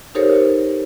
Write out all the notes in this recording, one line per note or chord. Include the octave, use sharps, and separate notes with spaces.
D#4 G4 A4 A#4 C5 C#5